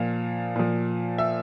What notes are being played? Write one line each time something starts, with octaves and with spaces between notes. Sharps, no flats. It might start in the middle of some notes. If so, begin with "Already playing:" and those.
Already playing: A#2 F3 F5
A#2 F3
E5